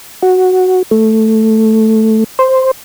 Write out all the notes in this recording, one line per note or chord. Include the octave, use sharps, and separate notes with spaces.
F#4
A3
C5